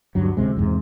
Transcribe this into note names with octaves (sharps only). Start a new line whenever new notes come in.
D2 G2 F#3
D2 C3 G#3
E2 G#2 C3